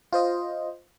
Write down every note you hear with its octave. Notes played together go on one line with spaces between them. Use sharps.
F4 C5 D#5